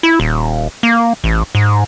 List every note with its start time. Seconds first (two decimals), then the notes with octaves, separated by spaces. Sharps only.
0.03 E4
0.20 D#1
0.83 A#3
1.24 A1
1.55 G#2